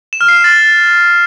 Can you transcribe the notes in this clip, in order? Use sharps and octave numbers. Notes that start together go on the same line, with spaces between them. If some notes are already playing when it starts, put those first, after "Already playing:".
E7
F6
C7
E7
A6